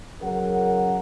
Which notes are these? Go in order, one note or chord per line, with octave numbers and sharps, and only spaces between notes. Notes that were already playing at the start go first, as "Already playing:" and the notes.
F#2 C#3 A#4 F#5